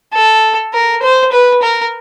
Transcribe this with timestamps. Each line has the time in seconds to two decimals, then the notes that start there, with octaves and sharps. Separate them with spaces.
0.14 A4
0.74 A#4
1.02 C5
1.32 B4
1.62 A#4